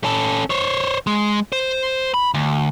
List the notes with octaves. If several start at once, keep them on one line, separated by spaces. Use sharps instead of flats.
C#4 A4
C5 C#5
G#3
C5
B5
D2